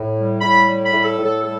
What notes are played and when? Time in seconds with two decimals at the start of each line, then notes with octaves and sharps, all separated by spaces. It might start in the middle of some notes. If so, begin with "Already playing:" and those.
Already playing: A2
0.16 G3
0.41 A2 B5
0.67 G3
0.85 B5
0.92 A2
1.04 A4
1.17 A2
1.24 A4
1.42 G3 A4